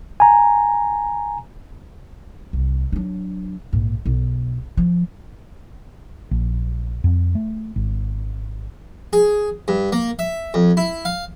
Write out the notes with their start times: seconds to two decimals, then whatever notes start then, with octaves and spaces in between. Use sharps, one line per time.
0.20 G#5 A#5
2.53 C2
2.92 F#3 D4
3.73 A#1 G#2
4.06 B1
4.77 F3
6.31 A#1
7.04 F2
7.35 A3
7.76 G#1
9.13 G#4
9.68 G2
9.92 A#3
10.19 E5
10.54 F2
10.77 E4
11.05 F5